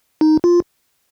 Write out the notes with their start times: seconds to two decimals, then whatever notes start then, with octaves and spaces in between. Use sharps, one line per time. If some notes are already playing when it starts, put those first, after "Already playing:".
0.21 D#4
0.44 F4